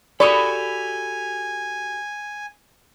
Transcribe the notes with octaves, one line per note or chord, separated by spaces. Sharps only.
F#4 G4 A4 D5 G#5 B5 C#6 D#6